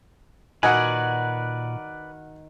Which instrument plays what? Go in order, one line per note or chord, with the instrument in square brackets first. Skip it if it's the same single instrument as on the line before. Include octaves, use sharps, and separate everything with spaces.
[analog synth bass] A#2 [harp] D#3 F#5 [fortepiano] F#4 D#5 G#5 [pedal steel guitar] B4 D5